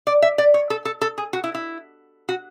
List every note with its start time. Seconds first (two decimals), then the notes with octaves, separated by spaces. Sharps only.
0.07 D5
0.22 E5
0.38 D5
0.54 C#5
0.70 A4
0.85 A4
1.01 A4
1.18 G#4
1.33 F#4
1.44 E4
1.55 E4
2.29 F#4